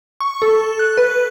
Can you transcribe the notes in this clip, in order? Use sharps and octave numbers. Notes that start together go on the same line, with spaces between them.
C#6
A4
F#6
B4